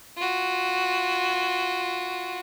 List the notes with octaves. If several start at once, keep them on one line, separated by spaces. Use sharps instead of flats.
F4 F#4